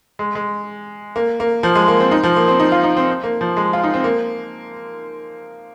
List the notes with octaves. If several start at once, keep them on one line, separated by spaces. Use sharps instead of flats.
G#3
G#3
A#3
A#3
F3
G#3
A#3
C4
D#4
F3
A#3
C4
D#4
F4
D#4
C4
A#3
F3
G#3
F4
D#4
C4
A#3